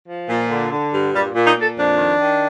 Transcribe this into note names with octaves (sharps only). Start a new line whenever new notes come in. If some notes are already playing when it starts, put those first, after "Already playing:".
F3
A#2
D3
D3
G2
A#2 G3
A#2
D#4
A#2
A4
F2 D4
D#3
D#3